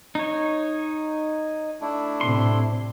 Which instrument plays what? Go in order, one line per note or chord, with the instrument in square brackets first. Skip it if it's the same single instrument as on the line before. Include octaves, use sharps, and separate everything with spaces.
[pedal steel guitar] D#4 C#5
[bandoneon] A3 D4 E4
[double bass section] A2 C3 [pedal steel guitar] C6